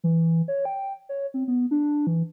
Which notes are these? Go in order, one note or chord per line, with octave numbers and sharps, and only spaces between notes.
E3
C#5
G5
C#5
C4
B3
D4
E3